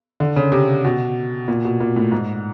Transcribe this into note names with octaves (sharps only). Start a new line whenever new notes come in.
D3
C#3
C3
B2
A#2
B2
A#2
A2
G#2